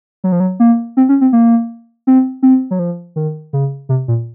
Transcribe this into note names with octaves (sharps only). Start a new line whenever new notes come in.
F#3
F3
F#3
A#3
C4
C#4
C4
A#3
C4
C4
F#3
F3
D#3
C#3
C3
A#2